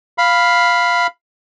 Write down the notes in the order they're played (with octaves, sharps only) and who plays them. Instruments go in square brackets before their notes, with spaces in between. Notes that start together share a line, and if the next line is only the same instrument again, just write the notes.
[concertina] F5 B5